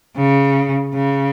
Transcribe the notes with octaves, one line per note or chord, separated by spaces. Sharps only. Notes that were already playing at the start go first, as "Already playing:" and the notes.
C#3
C#3